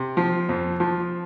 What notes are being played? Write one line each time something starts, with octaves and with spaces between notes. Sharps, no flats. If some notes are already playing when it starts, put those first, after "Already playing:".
Already playing: C3
F3
F2
F3